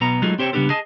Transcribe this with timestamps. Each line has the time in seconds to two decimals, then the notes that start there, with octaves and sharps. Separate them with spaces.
0.01 B1 B2 B3 A#5
0.22 F#3 G#3 A3 D#4 F4 G#4
0.39 C4 G4 C5 C#5 G5
0.53 C#3 G3 B3 D4 G4 A4
0.70 G#4 D#5 G#5 A5